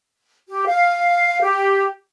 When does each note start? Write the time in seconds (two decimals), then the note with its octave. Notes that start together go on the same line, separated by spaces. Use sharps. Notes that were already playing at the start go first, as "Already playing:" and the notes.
0.49 G4
0.67 F5
1.41 G4